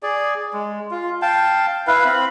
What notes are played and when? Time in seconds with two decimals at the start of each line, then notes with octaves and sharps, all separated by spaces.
0.03 G#4 D5
0.54 G#3
0.91 F4
1.22 F5 G5 A5
1.87 E4 B4 F5
2.05 C4 B5